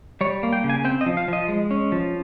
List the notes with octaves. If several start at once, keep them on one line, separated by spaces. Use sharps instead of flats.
G3 C#5
A#3
G5
C#3
G#5
C4 G5
D#5
F3
F5
F3 D#5
G#3
C#4
F3